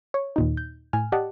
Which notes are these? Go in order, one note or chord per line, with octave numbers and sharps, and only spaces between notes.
C#5
D#2 A#2 D#4
G6
A2 G#5 F6
G4 D5 D#5 F#5 A5